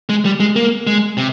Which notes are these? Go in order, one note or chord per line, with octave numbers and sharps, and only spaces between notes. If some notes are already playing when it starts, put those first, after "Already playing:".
G#3
G3
G#3
A#3
G#3
C3